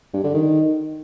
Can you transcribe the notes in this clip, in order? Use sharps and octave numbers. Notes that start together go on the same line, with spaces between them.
G2
D3
D#3